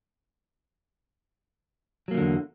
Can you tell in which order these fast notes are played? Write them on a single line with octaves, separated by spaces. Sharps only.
F#3 A#3 E3 D3 E2